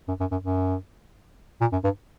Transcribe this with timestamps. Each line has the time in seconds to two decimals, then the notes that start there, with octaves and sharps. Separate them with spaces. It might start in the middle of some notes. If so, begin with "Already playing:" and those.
0.08 F#2
0.20 F#2
0.32 F#2
0.44 F#2
1.61 A#2
1.72 F#2
1.84 G2